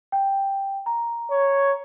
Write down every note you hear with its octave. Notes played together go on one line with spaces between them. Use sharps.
G5
A#5
C#5